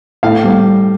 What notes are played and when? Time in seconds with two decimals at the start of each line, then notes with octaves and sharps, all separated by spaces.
0.23 A2 F5
0.44 G3